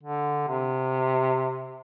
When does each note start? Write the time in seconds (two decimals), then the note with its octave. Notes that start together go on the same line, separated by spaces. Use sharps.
0.03 D3
0.48 C3